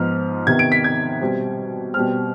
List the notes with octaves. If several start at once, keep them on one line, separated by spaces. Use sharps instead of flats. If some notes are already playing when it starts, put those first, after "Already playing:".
Already playing: G#2 F3 B3 F6
C3 D#3 B3 G#6
D7
B6
G#6
B2 G3 C4
B2 G3 C4 F6